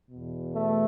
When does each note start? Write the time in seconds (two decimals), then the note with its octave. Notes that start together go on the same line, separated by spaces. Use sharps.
0.11 E2 B2
0.55 A3